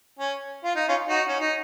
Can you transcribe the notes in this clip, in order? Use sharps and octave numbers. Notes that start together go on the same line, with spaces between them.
C#4
F4
D#4
C#4 F4
D#4 F#4
C#4
D#4